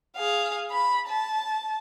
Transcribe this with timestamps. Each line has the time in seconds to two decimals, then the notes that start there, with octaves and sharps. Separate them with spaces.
0.16 G#4 F5
0.71 B5
1.08 A5